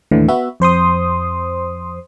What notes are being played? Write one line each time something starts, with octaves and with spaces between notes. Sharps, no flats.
D#2 A2 D3 E3
B3 F#4 E5
F2 C5 C6 D#6